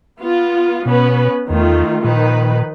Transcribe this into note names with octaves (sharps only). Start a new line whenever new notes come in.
B3 F4
B2 B3 C#4 B4
E2 D#3 A3 F4
A#2 D#3 F3 B4